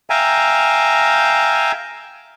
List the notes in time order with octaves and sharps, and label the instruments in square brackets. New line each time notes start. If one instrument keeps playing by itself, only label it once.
[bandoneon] E5 F5 G5 G#5 A#5